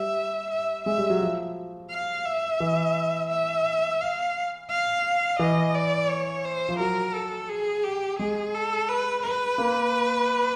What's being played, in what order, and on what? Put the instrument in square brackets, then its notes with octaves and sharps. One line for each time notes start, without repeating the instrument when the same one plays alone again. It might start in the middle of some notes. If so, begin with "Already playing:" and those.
Already playing: [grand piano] G3 [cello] E5
[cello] E5
[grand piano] G#3 [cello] E5
[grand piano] G3
F#3
F3
[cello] F5
E5
[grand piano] E3
[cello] E5
F5
F5
[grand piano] E3 [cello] D#5
[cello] D5
C#5
C5
[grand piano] F3
[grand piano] F#3 [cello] A#4
[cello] A4
G#4
G4
[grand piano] G#3 [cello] G#4
[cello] A4
B4
B4
[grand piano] A#3